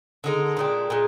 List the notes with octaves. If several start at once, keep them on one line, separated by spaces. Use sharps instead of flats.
D3 G#3 D#4 A#4
A#2 G#3 D4 G4
A#2 G#3